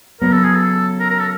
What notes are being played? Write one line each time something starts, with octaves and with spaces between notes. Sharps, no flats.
C#3 F#3 B3 A#4
A4
G#4
A4
A#4
A#4
A4